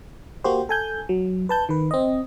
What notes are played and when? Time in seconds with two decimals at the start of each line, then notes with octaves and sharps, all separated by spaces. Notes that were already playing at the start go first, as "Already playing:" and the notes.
0.44 A#3 F#4 G4 C5
0.69 A4 G#5 G6
1.09 F#3
1.49 B4 A5 G6
1.69 D#3 B4
1.91 C4 D#5